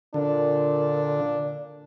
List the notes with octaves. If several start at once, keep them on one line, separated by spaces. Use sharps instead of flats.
A#2 D3 D4